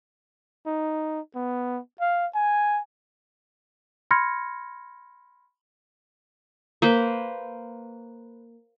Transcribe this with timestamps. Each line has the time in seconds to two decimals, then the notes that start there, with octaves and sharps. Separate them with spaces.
0.66 D#4
1.35 B3
2.00 F5
2.35 G#5
4.11 B5 C6 F6 G#6 A#6 C#7
6.82 A#3 B4 C5